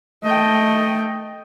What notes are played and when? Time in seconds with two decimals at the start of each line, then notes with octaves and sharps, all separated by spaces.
0.24 A3 D#5 G5